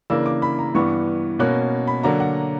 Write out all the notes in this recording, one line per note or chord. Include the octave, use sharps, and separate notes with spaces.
C#3 E3 A#3 D4 E6
D6
B5
A#5
G2 E3 B3 D4 C#6
B2 A#3 C#4 F#6
B5
D3 F#3 A#3 D4 A#5
F#5